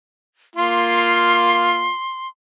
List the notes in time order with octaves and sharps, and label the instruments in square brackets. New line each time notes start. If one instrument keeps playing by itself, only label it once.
[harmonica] A#3 F4 [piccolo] C6